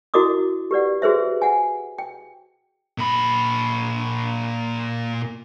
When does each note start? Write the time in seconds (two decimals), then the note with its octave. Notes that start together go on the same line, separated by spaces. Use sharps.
0.14 E4 F#4 A#4 D#5 D6 D#6
0.71 G4 B4 D5 F#5
1.02 F#4 G#4 B4 C5 E5
1.42 F#5 G#5
1.98 G5
2.98 A#2 B5